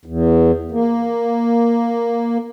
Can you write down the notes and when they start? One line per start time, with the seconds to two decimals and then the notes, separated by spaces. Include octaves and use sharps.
0.05 E2
0.72 A#3